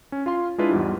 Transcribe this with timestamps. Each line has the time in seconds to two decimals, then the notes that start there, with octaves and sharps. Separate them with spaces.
0.12 C#4
0.26 F4 F5 C6
0.58 G#3 D4 E4 F4 B4
0.71 E2 G#2 G3